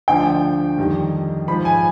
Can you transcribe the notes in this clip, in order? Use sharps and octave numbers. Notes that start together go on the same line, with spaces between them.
D2 D3 F3 G5
F2 D#3 G3
G#2 F3 B5
G#5